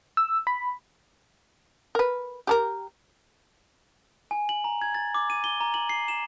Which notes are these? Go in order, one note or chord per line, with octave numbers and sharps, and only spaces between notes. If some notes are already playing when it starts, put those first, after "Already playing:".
E6
B5
A#4 B4
G4 A4 A#4
G#5
F#7
A#5
G#6
A6
D6
D#7
G7
A#5
F#7
C7
E7